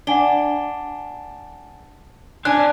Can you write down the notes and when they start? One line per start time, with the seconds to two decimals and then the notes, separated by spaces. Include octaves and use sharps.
0.07 D4 F#5 G#5 G7
2.45 C4 D4 G#5 F#6